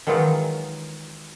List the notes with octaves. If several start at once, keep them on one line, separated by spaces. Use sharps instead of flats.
D#3 E3 F#3 G#3 D#4 F4